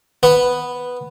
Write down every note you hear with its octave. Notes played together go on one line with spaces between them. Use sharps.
B3